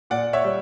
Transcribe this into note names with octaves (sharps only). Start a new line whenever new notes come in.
A#2 D5 F#5
C#5 E5
G3